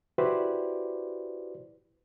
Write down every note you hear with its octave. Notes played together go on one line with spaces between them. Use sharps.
E4 F#4 G4 B4 C5 D5